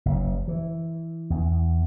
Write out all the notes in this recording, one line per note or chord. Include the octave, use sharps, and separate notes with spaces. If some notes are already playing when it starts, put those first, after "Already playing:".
F#1
E3
E2